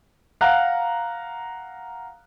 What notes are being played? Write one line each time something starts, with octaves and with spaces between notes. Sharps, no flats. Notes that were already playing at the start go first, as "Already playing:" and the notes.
F5 F#5 A#5 F#6